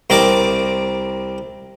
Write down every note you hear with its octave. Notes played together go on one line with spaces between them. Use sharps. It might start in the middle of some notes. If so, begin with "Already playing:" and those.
C2 C4 A#4 D5 D6